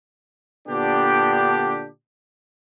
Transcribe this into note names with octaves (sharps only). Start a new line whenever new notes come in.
A#2 D3 B3 D4 G4